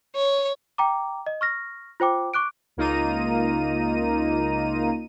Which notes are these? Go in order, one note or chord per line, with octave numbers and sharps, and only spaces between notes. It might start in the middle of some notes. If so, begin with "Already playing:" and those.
C#5
G5 A#5 D6
D#5
C#6 F6 A#6
F4 C5 G5 D6
C#6 D6 F#6 D7
C#2 A#3 D#4 F4 A#5 D#7